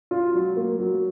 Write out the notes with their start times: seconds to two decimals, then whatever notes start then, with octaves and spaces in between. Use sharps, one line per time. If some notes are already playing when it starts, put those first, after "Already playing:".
0.11 F4
0.34 F#3
0.57 A#3
0.79 F#3